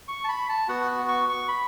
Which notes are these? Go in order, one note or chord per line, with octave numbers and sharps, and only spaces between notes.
C#6
A5
B5
A5
B3 F#4 F#5
C#6
C#6
B5